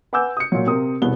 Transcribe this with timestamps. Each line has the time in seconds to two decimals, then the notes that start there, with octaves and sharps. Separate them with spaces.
0.13 B4 F#5 G#5 D6 E6 G6
0.37 D#6 C#7
0.52 A#2 F#3
0.67 C3 C4 A#4 D#6
1.02 E1 C2 B3 G7